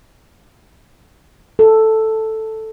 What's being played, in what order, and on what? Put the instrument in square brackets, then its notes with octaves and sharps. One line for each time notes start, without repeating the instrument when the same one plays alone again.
[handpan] A4